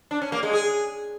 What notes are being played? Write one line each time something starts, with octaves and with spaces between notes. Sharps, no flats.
D4
C#4
A#3
G#3
G#4